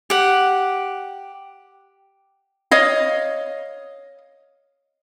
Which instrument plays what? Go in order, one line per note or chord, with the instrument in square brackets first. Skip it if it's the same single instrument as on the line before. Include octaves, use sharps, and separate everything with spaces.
[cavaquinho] G4 F#5
[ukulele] C#5 D#5 F5